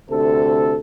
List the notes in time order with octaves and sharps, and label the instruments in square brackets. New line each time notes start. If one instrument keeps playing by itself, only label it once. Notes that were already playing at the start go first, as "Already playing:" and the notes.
[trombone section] D2 C3 A4